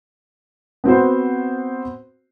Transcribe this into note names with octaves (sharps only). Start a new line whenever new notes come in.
B3 C4 F#4 C5